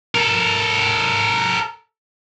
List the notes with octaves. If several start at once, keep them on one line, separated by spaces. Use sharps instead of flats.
A4 A#4